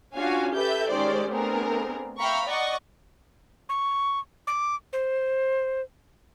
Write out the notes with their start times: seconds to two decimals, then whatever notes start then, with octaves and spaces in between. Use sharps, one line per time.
0.14 C#4 D4 F4 F#4 F5 G#5
0.53 G4 A4 B4 E5 G6
0.89 D#3 G#3 C#4 G4 C5 D5
1.29 A3 B3 C4 D4 G#4 A#4
2.19 E5 F5 G5 A#5 B5 C#6
2.47 D5 D#5 F#5 C#6
3.69 C#6
4.47 D6
4.93 C5